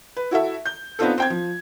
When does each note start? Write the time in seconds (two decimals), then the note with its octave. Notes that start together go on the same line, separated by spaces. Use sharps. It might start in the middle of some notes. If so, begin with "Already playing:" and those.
0.17 B4
0.31 E4 F#4 A4 E5
0.66 G6
0.99 B3 C4 D4 D#4 F4 A4
1.18 C4 G5 G#6
1.30 F3